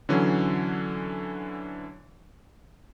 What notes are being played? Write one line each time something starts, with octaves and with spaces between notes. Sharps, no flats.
D3 E3 F#3 C#4